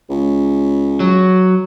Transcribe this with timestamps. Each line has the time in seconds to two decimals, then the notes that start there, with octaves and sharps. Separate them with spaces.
0.10 C#2
1.00 F#3